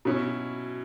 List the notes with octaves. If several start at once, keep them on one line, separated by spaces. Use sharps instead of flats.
B2 F#3 C#4 E4